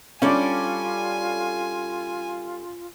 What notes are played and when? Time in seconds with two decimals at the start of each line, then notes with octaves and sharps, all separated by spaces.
0.22 G3 C#4 D4 F4 A4 D5 G#5